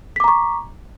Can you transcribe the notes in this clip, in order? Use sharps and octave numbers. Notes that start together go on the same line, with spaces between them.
A#5 C#6 D6 B6